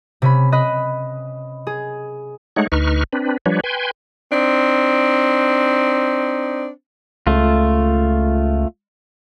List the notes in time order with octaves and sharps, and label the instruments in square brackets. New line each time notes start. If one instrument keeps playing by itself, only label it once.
[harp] C3 C#4 B5
D#5 B5 F#6
G#4
[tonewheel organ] G#3 A3 D#4 C#5 F#5
D2 D#4 B4 C#6 F6
C4 D4 B4
F3 G3 D4 B4 C#5
B4 G5 G#5 C6
[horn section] C4 D4 D#4
[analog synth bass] C#2 [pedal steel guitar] A3 F4